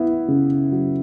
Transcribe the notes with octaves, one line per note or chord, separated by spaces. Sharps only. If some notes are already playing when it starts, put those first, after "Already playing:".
Already playing: B3 E4
C#3
F#3